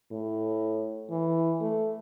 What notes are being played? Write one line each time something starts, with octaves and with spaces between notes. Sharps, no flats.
A2
E3
A3